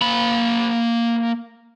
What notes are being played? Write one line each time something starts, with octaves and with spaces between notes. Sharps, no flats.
A#3 B5